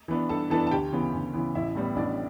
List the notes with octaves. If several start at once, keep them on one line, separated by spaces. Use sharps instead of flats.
E3 B3 D4
G2 A4 A5
E3 B3 D4 A4 A5
A5
D2 G4 G5
C#3 E3 B3
D2
C#3 E3 B3
A1 E4 E5
A2 G3 B3
A1 D4 D5